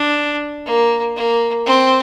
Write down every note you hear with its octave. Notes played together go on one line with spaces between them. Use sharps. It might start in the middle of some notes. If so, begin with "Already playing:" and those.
Already playing: D4
A#3
A#3
C4